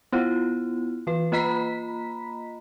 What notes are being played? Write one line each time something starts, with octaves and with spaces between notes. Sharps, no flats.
B3 E4 F4
E3 B4
A#3 F4 D#5 A#5 B5 B6